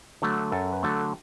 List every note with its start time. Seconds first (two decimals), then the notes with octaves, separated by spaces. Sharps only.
0.22 D3 F#3 A3
0.52 F#2 A4
0.73 B4
0.83 D3 F#3 A3 A4